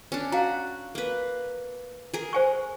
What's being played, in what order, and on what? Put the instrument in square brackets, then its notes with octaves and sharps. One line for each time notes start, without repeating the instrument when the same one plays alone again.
[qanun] C#4 D4
[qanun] F#4 [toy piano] F5 A#5
[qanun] A#3 B4
G#4 A#4
[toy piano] C5 G#5 C#6